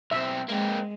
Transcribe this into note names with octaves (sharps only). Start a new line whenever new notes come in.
B1 C4 E5
G#3 A#3 C4